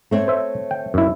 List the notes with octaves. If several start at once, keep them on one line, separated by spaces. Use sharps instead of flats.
A3 C4 C#5
C5 E5
G5
F#2 E4